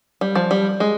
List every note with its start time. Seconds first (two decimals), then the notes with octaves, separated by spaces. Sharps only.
0.21 G3
0.35 F3
0.51 G3
0.80 G#3